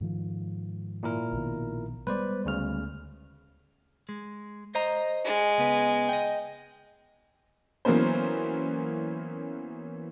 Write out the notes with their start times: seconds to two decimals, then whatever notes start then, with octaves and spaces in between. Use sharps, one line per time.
0.01 G#2 D#3 F3
1.03 A#2 E4 A#4
1.32 A#1 B2 D#3
2.07 G3 G#3 B3 B4 C5 D5
2.45 D2 C#3 F6
4.09 G#3
4.75 C5 D#5 A#5
5.25 G#3
5.58 C#3 B3 B4
6.09 D#5 G5
7.85 E3 F#3 A#3 B3 C#4 C5